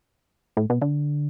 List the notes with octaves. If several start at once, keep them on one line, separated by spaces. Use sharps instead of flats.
A2
B2
D3